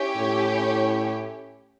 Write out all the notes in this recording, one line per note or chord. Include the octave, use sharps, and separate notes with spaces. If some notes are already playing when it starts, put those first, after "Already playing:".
Already playing: C#4 E4 G4 C#5
A2